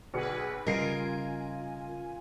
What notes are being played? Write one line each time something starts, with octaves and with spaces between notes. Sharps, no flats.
B1 G#4 B4 C#7
C#3 G3 F4 A#4 D#5 G#5 C7 D7